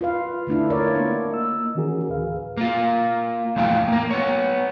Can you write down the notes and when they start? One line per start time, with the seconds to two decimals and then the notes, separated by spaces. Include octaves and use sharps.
0.01 F4 B4 F5
0.47 D3 A3 D4 E4
0.70 F4 A#4 C#5 D5
0.95 A#3 B3 D4
1.30 A#3 D#5 E6
1.75 D#3 E3 C#4 F#4 G#4 A#4
2.08 D2 A2 G#4 B4 F5
2.57 A#3 F4
3.56 E2 A2 F3 F5 G5
3.88 A#3 A#4
4.11 B3 C#5